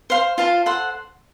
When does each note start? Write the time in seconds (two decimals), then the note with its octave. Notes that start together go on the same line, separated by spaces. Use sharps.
0.10 C5 F5 C6
0.38 F4 C5 F5 A5
0.66 A4 C5 F#5 C6